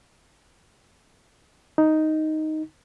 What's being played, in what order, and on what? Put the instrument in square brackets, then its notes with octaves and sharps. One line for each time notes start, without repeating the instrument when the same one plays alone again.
[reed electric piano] D#4